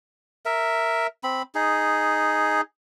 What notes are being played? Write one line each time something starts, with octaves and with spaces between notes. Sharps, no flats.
A#4 E5
C4 B5
D#4 G#4